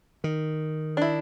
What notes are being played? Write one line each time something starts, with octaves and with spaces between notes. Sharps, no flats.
D#3
D4 E4